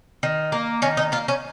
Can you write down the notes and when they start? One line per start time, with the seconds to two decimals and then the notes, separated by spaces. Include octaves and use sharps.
0.23 D#3
0.52 A#3
0.82 D#3 C#4
0.97 D#4
1.12 A#3 F4
1.28 C#4